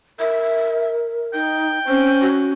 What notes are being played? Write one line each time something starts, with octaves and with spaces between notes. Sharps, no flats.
A#4 E5
D#4 G5
C4 C#4 C5
F#4